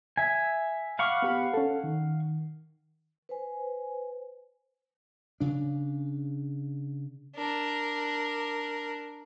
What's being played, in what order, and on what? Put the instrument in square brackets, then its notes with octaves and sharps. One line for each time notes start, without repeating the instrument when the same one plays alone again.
[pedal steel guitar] E5 G#5
[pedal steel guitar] F5 F#5 C#6 [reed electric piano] B5 D6 F6
[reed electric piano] B3 G4 B5
C#4 A4
D#3
[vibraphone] B4 C5 G#5
[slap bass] C#3 D4
[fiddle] D4 A#4